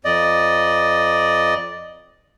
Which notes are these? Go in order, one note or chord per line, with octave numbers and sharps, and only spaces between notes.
F2 D5 D#5